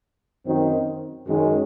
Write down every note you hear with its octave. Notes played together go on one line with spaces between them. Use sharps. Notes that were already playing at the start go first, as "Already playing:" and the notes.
F#2 D#3 F#3 C4
F#2 D#3 G#3 C#4